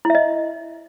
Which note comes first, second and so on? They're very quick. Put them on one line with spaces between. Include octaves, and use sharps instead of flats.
E4 E5 D#5